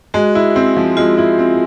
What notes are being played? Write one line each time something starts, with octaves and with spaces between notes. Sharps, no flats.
G#3 F#4
E4
C4
F3
G#3 F4
E4
C4